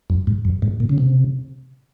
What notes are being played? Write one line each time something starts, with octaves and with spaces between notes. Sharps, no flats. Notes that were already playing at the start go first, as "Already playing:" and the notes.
F#2
G#2
F#2
G#2
A#2
C#3
C3